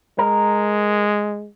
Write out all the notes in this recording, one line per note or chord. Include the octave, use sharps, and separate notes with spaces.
G#3 A#4